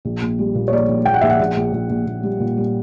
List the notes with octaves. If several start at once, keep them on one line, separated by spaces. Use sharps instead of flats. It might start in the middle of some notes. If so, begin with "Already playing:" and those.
A#1
A#1
G3
A#2
C#5
A#1 D5
A#1
A#1 G5
F#5
A#1 E5
F#5
A#1
A#1
A#1
A#1
A#1
G3
A#2
G3